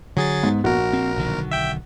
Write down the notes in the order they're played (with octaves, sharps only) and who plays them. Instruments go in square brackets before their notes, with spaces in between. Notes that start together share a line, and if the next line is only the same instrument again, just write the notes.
[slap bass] D3 [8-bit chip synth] F#3 G#4 A6
[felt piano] G#2 [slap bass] B3
[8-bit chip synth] A#1 A#4 [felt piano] F#4
[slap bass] C4
B1 D3 D#3
[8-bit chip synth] E5 G5